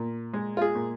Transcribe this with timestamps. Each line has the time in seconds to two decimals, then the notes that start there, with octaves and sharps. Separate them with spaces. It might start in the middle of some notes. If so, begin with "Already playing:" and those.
Already playing: A#2
0.34 G#3
0.57 F4
0.62 G#4
0.75 A#2